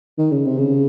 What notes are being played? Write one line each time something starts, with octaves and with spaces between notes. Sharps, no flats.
D#3
C#3
C3
C#3